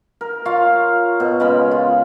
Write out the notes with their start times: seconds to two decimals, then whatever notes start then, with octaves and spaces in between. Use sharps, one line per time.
0.21 A#4
0.45 F4 C#5 F5
1.20 B2
1.40 C#3 G#3 B5
1.71 F4